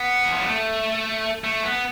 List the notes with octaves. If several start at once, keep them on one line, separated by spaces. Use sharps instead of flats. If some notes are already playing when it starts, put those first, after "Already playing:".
Already playing: B3
E3
F3
G3
A3
A3
B3